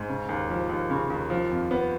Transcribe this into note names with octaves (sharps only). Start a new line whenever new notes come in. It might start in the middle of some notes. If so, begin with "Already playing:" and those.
Already playing: G#2
C#3
D#2
F3
D#2
C#3
D#2
F3
F2
B3